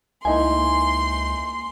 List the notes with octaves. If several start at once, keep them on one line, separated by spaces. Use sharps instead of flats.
C#2 A#3 D#4 E4 G#5 C6